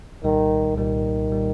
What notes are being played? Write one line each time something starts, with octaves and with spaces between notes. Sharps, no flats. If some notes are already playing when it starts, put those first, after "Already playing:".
C2 A#2 D#3 G3
C2 A#2 D#3 G3
A#2 G3